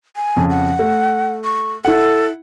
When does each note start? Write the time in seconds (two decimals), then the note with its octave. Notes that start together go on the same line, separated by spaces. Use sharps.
0.16 G#5
0.36 F2 C#3
0.50 F#5
0.79 A3
1.44 C#6
1.85 E4 A4 F#5